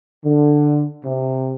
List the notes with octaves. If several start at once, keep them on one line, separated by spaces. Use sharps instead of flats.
D3
C3